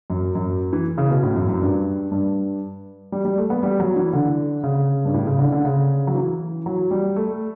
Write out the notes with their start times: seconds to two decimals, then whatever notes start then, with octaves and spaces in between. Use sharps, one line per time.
0.10 F#2
0.35 F#2
0.73 E3
0.98 C#3
1.10 B2
1.23 A2
1.36 F#2
1.48 F#2
1.61 G2
2.11 G2
3.12 G3
3.25 G3
3.38 A3
3.50 B3
3.63 G3
3.80 F#3
3.96 E3
4.13 D3
4.63 C#3
5.05 G2
5.14 A2
5.26 C#3
5.39 D3
5.52 D3
5.65 C#3
6.07 F#3
6.15 E3
6.66 F#3
6.91 G3
7.16 A3